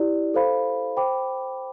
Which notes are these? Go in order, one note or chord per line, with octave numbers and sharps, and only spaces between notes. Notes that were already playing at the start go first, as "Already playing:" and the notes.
Already playing: E4 G4 D5
A4 C5 F5 B5
C5 G5 B5 D6